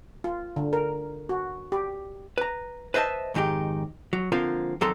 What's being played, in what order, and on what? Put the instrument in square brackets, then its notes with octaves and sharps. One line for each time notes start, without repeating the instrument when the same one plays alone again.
[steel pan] F4
D3
A#4
F#4
G4
[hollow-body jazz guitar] B4 A#5
B4 C5 D#5 E5 A5
F2 G#2 D#3 D#4 G4
F#3
D3 F3 A#3 C4 F4 A#4
F2 D#3 F#3 A4 A#5 C6